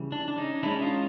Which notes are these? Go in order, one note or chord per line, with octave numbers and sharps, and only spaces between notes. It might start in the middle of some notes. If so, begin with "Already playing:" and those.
Already playing: C#3 E3 G3
D4
D4
C#4 D#4
E3 G#3 C#4 D4 E4
D#4 F4